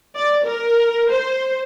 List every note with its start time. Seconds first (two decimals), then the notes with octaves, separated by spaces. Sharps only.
0.16 D5
0.45 A#4
1.10 C5